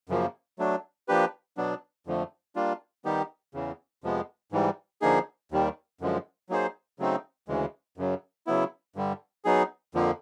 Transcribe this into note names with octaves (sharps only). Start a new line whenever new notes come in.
F#2 C#3 F3 A#3
F#3 A3 D4
F3 A#3 D4 G4 B4
B2 F#3 B3 D4
F2 D3 F3 A3
G3 A#3 D4 F4
D#3 G3 B3 D#4 G4
E2 C#3 E3
F2 C3 F3 G#3 B3
G#2 E3 G3
D3 F3 A#3 D#4 G#4
D#2 D#3 G3
F#2 D3 F3 G#3
F#3 A#3 D#4 G#4 C5
C#3 F#3 A3 C4 D#4
D2 C#3 E3 G#3
F#2 C#3 F#3
C#3 F#3 B3 E4
G2 D3 G3
F#3 B3 D#4 G#4
F2 D3 F3 A#3